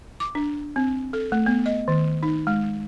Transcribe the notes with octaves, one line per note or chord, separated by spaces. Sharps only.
D6
D4
C4
A4
A3
B3
D#5
D#3
D#4
G#3